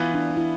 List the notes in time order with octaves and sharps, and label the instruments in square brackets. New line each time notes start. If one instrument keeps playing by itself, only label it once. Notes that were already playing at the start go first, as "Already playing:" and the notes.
Already playing: [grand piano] E3 B3 F4
[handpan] D4
D4
E4